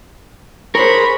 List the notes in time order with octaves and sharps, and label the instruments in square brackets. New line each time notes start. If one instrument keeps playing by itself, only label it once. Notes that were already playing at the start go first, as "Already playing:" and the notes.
[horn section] G#4 C#5 B5 [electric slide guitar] A#4 C5